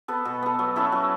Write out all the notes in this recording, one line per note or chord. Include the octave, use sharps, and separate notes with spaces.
B3 A4
B2
B3 A4
F#3
C#4 E4 A4
F#3